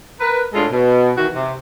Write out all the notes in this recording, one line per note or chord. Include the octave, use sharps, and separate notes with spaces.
A#4 B4
A2 G#3 D4 F4 G#4 A4
B2
D#3 E3 F#4
C3